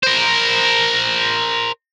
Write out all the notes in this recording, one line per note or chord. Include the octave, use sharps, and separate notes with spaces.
A#4 C5